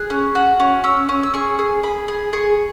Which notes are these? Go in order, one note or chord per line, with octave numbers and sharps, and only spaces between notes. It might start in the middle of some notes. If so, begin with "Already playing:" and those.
Already playing: G#4 F#6
C#4
F#4 F#6
C#4
C#4 E6
C#4
E6
G#4 C#6
G#4
G#4 B5
G#4
G#4 C#6